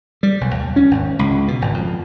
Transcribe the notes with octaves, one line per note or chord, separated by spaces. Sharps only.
G3
B1
D#2
C#4
G#1
C#2
B2
G#1
F2